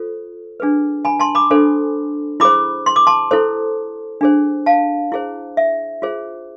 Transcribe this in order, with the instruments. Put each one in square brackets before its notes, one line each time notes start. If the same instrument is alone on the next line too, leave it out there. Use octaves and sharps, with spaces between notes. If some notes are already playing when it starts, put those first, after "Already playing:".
Already playing: [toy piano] F4 A4 C5
D4 G#4 B4
G#5 B5
A5 C6
B5 D6
D4 A4 C5
E4 G#4 C5 B5 D6
C6
D6
A5 C6
E4 A4 C5
D4 G#4 C5
F5 A5
E4 G#4 C5
E5
F4 G#4 C5